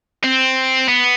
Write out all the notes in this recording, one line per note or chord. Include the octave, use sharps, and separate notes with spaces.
C4
B3